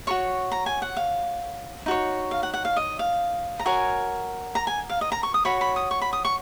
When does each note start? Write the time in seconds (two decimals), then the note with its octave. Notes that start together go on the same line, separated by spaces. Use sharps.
0.07 F#4 A#4 C#5 C#6
0.52 A#5
0.66 G#5
0.82 F#5
0.97 F5
1.86 D#4 F#4 C#5
2.31 F5
2.43 F#5
2.54 F#5
2.65 F5
2.76 D#5
2.99 F5
3.59 A#5
3.66 F#4 A#4 C#5 G#5
4.55 A#5
4.67 G#5
4.90 F5
5.01 D#5
5.12 A#5
5.23 C#6
5.34 D#6
5.45 F#4 C#5 B5
5.61 B5
5.76 D#6
5.91 C#6
6.02 B5
6.13 D#6
6.25 C#6